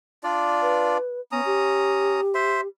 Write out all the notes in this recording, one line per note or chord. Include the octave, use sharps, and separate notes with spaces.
D4 F4 D5
B4
B3 C#4 A#5 D#6
G4
C5 E5 C6